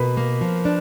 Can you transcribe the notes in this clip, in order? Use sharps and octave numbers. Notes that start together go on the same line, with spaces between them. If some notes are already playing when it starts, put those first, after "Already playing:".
Already playing: B2 A#4 B4
A#3
F3
D4